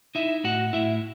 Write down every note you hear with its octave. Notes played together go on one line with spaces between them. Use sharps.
D#4 E4 E5
A2 F#4 F#5
A2 E4 E5